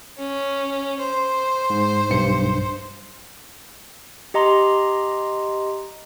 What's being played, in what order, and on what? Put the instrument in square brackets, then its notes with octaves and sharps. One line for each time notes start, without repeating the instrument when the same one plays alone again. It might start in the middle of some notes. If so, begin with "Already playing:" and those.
[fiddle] C#4
C5
[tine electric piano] G#2
B1 G2 C#7
[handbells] G4 D#5 A#5 C6